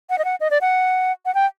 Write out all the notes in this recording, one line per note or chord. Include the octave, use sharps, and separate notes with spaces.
F#5
D#5
F#5
D#5
D5
F#5
F#5
G5